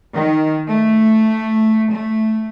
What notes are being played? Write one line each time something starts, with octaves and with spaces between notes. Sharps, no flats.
D#3
A3
A3